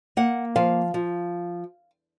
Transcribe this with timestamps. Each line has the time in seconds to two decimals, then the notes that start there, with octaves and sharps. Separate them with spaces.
0.17 A#3 F#5
0.56 F3 F5
0.94 F3